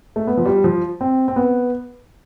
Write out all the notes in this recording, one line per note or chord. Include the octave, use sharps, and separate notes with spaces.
A3
B3
F3
G3
F3
C4
C4
B3